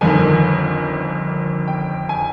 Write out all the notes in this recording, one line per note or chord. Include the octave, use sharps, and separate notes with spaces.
G1 F2 D#3 G#5
G5
G#5